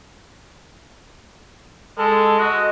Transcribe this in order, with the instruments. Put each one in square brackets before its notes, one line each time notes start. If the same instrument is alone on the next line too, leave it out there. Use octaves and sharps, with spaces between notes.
[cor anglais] G#3 [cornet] A4
[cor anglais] F#4 [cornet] D#5